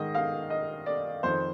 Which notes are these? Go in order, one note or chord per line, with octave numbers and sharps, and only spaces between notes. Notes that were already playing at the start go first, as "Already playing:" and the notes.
Already playing: G#2 D#3 D#5
F5
D#5
D5
F2 D#3 C5